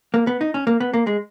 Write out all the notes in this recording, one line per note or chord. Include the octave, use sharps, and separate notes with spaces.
A#3
B3
D#4
C#4
A#3
B3
A#3
G#3